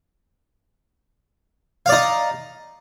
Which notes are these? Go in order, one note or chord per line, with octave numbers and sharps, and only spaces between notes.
D#4 D5 F5